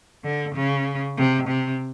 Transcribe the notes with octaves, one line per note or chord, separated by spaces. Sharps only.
D3
C#3
C3
C3